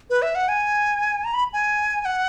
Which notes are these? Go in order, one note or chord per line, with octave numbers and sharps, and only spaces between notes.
B4
E5
F#5
G#5
A#5
B5
G#5
G#5
F#5